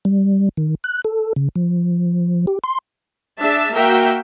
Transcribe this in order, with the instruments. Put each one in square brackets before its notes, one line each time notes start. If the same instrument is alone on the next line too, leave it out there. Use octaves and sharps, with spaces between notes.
[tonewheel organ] G3
D#3
F#6
A4
C#3
F3
G4
C6
[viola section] D4 G#4 E5 A5
A#3 F#4 A#4 E5 F5 G5